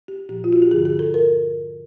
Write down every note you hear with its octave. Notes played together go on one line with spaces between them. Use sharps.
G4
A#2 F3 G4
F4
F#4
G4
G2 D3 F3 G#4
G#4
A4
A#4